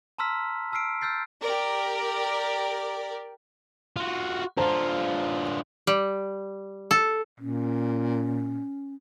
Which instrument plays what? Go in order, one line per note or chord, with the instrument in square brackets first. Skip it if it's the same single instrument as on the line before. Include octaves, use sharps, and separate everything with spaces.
[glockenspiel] A5 A#5 C6 E6 F6 B6
A5 E6 F6 C7 D7
E6 F6 G6 A6 C7
[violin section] G4 A#4 D5
[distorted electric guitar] F4 F#4
[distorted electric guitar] D3 F4 [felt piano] C5 A5 A#5
[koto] G3
A4
[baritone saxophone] A#2 [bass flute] C#4